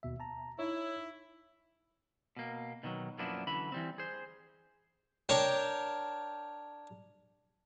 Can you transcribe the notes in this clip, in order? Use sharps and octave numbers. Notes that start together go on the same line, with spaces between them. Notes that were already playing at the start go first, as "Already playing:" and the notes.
D#2 B2 E5
A5 A#5
D#4 E4 C#5
B2 A#3
B2 D#3 F3 F#3
F#2 F3 A#3 B3 D4 E4
F#2 D3 E3 B5
E3 G3 C4
G#4 C5
D4 A#4 C#5 G5 A5